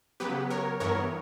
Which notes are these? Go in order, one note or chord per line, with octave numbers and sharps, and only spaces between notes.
C#3 F#3 B3 G4 B4
A#4 C#5
G2 E3 B3 A#4 C#5